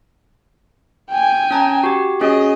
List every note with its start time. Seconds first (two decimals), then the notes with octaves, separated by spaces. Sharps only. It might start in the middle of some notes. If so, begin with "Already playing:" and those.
1.10 G5 G#5
1.51 C#4 A5 A#5
1.83 F#4 G4
2.21 C#4 F#4 G#4 D#5